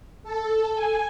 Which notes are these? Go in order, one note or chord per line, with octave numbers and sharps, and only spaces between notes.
A4
G#5